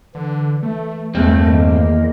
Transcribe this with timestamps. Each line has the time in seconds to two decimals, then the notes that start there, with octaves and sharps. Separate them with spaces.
0.15 D3 E3
0.63 A3
1.15 E2 G2 A3 A#3 C4
1.46 D#3 A#3 D#5